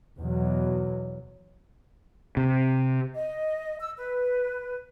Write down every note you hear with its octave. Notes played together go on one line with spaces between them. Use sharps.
E2 B2 F#3
C3
D#5
E6
B4